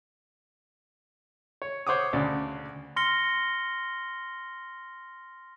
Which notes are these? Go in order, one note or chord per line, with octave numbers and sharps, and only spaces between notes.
C#5
C5 C#5 F#5 D6 D#6
D2 C#3 D5
C6 F6 A#6 C#7 G7